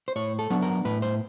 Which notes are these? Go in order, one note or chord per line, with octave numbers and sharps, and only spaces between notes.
C5
A2 C#5
A4
F#3 B3 D4
A#4
A2 B4
C5